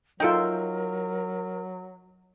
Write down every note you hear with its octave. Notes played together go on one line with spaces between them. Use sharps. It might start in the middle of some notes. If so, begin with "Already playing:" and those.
F#3 D#4 F4 A4 A#4 E5 G5